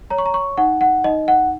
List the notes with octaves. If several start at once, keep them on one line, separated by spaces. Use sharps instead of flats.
C#5 A#5
C#6
A#5
C#6
D#4 F#5
F#5
D#4 D#5
F#5